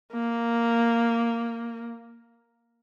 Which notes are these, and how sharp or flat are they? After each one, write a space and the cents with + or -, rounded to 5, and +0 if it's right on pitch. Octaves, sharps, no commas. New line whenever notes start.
A#3 -5